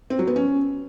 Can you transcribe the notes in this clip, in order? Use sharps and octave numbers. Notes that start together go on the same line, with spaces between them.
C4
F#3
B3
C#4